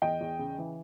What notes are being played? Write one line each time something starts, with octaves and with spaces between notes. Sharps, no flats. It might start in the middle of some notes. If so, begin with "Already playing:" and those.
E2 D#5 G5
E2
C#3
E3